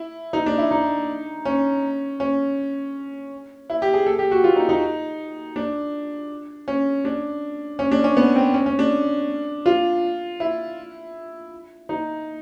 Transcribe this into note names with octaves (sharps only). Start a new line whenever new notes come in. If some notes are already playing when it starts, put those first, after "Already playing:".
Already playing: E4
D#4
D4
E4
D#4
C#4
C#4
E4
G4
G#4
A4
G4
F#4
F4
D#4
D#4
D4
C#4
D4
C#4
D4
C#4
B3
C4
C#4
C#4
D4
F4
E4
D#4